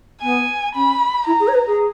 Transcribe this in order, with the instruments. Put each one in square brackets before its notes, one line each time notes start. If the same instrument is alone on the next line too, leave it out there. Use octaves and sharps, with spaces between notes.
[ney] B3 [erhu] G#5
[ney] C#4 [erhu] B5
[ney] E4 [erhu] A#5
[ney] G#4
C#5
B4
G#4